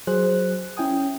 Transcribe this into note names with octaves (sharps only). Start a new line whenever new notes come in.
F#3 G#4 C5 F#6
C#4 E4 G5 G#5 D#6